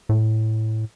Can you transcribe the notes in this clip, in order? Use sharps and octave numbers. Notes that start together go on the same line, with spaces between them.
A2